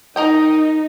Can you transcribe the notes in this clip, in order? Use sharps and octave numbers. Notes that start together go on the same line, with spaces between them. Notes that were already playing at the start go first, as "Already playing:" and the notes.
D#4 A#4 D#5 G5